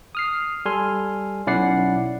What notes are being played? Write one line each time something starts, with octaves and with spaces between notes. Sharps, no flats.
D#6 F6 C7
G3 A4 G#5 C6 F6
B1 C#4 E4 D5 F#5 C7